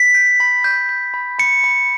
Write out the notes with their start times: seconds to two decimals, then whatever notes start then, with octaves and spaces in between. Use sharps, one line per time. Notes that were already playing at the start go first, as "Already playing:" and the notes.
Already playing: B6
0.15 G6
0.40 B5
0.64 G6
0.89 G6
1.14 B5
1.39 B5 C#7
1.64 B5